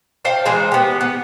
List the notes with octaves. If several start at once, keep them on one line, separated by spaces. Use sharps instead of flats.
C5 F5 G5 A5
E3 G#3 A#4 C5
B3 G4
B3